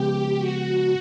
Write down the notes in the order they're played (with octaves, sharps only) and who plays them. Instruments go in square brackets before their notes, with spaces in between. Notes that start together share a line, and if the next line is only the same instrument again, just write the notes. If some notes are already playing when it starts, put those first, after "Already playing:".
Already playing: [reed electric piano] C#3 F3 G#3 B3 [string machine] G4
[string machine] F#4